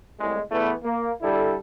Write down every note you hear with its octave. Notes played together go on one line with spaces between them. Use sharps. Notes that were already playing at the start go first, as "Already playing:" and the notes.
C2 A2 G#3
E2 E3 A3 B3
A#3
D3 G3 E4 A4